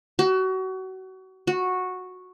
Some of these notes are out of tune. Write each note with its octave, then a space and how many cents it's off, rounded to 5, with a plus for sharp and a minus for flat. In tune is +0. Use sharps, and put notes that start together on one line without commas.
F#4 +30
F#4 -10